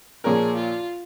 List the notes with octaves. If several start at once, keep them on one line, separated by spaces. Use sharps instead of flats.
A#2 F3 C#4 G#4 A#4
F4